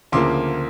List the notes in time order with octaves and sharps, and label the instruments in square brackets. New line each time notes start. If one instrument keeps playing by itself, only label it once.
[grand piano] D2 C#3 F3 A#3 C6 D6